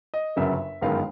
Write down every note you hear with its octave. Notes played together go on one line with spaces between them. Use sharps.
D#5
G1 F#2 C#3 F#3 A#3 E5
G1 F#2 D#3 G#3 B3 F5